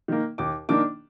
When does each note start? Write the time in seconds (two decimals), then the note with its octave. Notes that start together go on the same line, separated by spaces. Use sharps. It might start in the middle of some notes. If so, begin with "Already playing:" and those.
0.08 D#3 A#3
0.38 D#2 D6
0.69 D#3 A#3 D4 D6